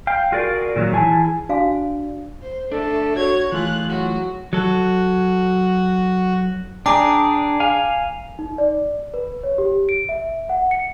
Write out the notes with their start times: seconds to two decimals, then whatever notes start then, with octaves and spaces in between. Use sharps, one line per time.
0.07 F5 G5
0.32 F4 F#4 G#4 A#4 D5
0.76 A#2 D#3 F#3
0.93 E3 E4 G#4 G#5 A5
1.49 D4 F#4 F5 G#5
2.42 C5
2.72 A3 D4 A4
3.16 F#4 C#5 G#6
3.52 E3 A3 F4 G#4 F#6
3.87 F#3 F#4
4.53 F#3 F#4 A4
6.86 D4 G#4 G5 A#5 D6
7.60 F5 G#5
8.39 D#4
8.58 D5
9.14 B4
9.44 C#5
9.58 G4
9.89 D7
10.09 E5
10.49 F#5
10.71 C#7